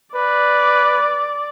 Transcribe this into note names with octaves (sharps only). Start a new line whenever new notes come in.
B4 D5